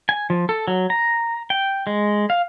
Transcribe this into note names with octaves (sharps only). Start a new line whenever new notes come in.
G#5
F3
A4
F#3
A#5
G5
G#3
F5